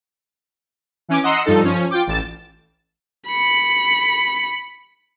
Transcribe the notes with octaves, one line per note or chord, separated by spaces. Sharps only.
E3 C#4 G#5 D6
D#5 F#5 A#5 C6 E6 C#7
G2 F3 D#4 A4
F3 C#4
F4 G5 D6
A1 A6 E7
B5 C#7